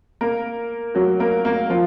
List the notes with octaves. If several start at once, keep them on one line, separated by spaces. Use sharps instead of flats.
A#3 A#4
F#3 F#4
A#3 A#4
A#3 A#4
F3 F4